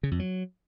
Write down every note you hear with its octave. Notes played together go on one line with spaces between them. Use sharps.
C#3
F2
F#3